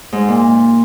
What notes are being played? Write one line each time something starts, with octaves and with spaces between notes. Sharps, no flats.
G#2
A#2